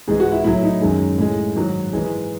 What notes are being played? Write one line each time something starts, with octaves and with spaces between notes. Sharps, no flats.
G#2 E3 G#3 G#4
F#4
E4
A2 F#3 E4
D#4
F#2 D#3 G#3
A2 G#3
G#2 D#3 F#3
G#2 E3 G#3